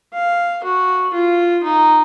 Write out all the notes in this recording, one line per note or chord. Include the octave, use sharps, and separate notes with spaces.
F5
F#4
F4
D#4